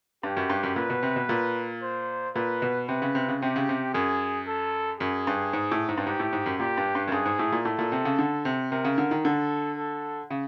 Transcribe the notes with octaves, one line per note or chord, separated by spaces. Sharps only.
G2 G4
F#2
G2
F#2
A#2 B4
B2
C3
B2
A#2
C5
A#2 B4
B2
C3 B4
C#3
C3
C#3
C3 G4
C#3
C3
F#2 G#4
A4
F#2 G#4
G2
G#2
A2
G#2
G2
G#2 G4
A2
G#2
F#2
A#2 G4
G2
G2
F#2
G2 G#4
G#2
A2
A#2
A2 A4
A#2
C3
C#3
D3
C3
C3 A#4
C#3
D3
D#3
D3 A4
A4
C#3